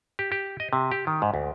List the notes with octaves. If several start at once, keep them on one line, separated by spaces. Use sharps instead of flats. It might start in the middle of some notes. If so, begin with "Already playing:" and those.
G4
G4
D#5
C3
G4
D#3
G#2
D2